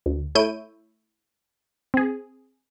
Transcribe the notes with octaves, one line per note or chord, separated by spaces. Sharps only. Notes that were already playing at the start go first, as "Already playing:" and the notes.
D2
A3 E4 C#5 G6 D7 D#7
C4 G#4